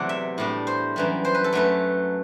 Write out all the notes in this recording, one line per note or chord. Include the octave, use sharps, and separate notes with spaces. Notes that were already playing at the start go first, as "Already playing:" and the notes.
Already playing: E2 C3 F#3 A3 E4 D5 F#5
E5
A2 G3 D4
C5
F#2 E3 G3
C5
B4
A4
F#2 F#3 A3 B4